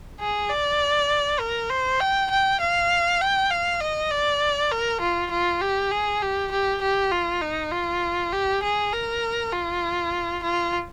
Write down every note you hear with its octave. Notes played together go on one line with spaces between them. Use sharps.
G#4
D5
A#4
C5
G5
G5
F5
G5
F5
D#5
D5
A#4
F4
F4
G4
G#4
G4
G4
G4
F4
D#4
F4
G4
G#4
A#4
F4
F4